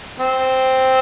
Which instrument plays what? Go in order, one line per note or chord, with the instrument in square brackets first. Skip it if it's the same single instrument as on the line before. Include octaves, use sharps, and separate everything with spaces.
[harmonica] C4